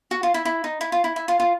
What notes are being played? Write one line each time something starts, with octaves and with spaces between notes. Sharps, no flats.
F#4
F4
E4
E4
D#4
E4
F4
E4
E4
F4
F4